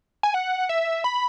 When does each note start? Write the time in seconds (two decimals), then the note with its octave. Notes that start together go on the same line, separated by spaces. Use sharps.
0.23 G#5
0.34 F#5
0.69 E5
1.04 B5